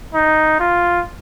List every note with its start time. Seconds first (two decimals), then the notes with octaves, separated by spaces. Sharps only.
0.14 D#4
0.60 F4